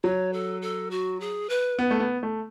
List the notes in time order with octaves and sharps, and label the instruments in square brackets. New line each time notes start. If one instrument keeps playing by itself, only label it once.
[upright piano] F#3 [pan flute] C#5
[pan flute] A4
A4
F#4
G#4
B4
[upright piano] B3
A3
B3
A3